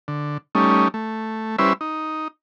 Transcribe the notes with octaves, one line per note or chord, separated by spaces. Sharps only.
D3
G3 A3 C#4 D#4
A3
G3 C#4 E4 B4 C5 E5
D#4